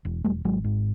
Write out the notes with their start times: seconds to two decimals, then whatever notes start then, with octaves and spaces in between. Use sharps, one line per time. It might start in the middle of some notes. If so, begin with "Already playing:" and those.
0.05 E1
0.24 E1 G3 A3
0.45 G#1 F#3 G#3
0.64 G#2